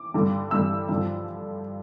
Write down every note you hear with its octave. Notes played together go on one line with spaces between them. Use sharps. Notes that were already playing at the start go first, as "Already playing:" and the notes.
Already playing: D6
G2 D3 G3
G2 D3 G3 E6
G2 D3 F3